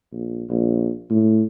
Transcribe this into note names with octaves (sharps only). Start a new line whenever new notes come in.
A#1
A#1
A2